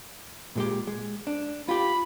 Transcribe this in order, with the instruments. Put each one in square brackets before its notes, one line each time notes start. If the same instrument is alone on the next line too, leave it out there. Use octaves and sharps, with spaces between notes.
[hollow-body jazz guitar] A#2 G#3 G4
G#3
D4
[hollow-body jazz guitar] F4 G4 [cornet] B5